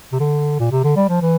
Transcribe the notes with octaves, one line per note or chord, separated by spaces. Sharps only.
C3
D3
A#2
C3
D3
G3
F3
E3